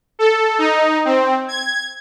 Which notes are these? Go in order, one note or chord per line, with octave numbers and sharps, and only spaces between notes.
A4
D#4
C4
G#6